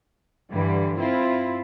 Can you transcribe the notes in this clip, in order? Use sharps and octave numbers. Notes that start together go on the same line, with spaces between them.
G2 D3 E3 G3
C4 E4 F4